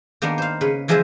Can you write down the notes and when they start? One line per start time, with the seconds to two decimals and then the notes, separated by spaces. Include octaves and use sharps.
0.22 D#3 A#3 B3 D4
0.38 C5 F5
0.61 C#3 B4
0.88 E3 F3 G#3 C5 E5 G#5